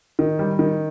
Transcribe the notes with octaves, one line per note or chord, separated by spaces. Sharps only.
D#3
G3
D#3